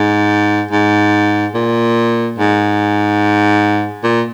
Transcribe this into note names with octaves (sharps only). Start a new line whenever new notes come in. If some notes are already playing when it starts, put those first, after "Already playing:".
Already playing: G#2
G#2
A#2
G#2
A#2